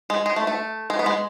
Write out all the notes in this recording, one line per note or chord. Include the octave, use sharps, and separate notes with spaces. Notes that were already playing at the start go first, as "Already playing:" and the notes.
G#3
G#3
A3
A3
G#3
B3
G#3